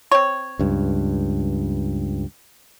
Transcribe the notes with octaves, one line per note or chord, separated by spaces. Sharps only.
C4 C#5
C#2 G2